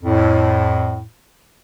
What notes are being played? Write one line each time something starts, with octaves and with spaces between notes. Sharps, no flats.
F2 A2